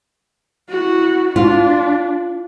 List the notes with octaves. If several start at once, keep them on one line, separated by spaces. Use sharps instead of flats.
E4 F#4
D4 F4